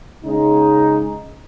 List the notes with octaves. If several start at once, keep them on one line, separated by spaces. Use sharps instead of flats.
C#3 G#3 D#4